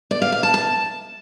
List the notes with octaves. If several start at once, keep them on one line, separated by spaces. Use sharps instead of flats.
D5
F5
F5
A5
A5